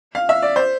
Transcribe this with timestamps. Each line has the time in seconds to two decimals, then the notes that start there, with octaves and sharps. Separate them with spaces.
0.15 F5
0.29 E5
0.42 D5
0.56 C5